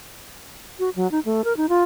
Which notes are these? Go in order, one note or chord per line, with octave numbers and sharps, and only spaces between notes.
F#4
F#3
D#4
A3
A#4
D#4
F4